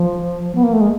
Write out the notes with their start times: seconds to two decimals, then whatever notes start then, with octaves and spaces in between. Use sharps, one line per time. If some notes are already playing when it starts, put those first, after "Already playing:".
Already playing: F3
0.55 B3
0.63 A#3
0.73 A3
0.81 G#3